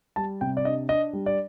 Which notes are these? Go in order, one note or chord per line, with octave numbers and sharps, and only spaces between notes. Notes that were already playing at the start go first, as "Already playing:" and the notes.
G3 A5
C3 G5
D5
D4 D#5
D4 D#5
G3
D5